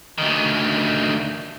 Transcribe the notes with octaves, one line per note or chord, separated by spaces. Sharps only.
D2 D#3